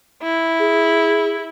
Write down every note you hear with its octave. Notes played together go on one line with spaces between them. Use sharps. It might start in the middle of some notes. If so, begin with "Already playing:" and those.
E4
G#4